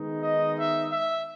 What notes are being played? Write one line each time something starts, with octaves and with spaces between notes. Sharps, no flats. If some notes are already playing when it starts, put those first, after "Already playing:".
Already playing: D#3 G#3 B3 D#4
D#5
E5
E5